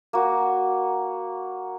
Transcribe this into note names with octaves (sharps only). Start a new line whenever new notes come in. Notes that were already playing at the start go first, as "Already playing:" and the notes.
A#3 F#4